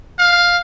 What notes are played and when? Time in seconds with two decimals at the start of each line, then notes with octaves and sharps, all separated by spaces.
0.19 F5